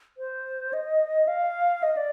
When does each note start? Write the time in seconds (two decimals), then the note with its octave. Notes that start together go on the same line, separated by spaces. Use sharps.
0.18 C5
0.73 D#5
1.28 F5
1.83 D#5
1.97 D5